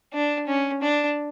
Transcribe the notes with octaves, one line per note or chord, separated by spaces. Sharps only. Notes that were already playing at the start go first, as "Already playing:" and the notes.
D4
C#4
D4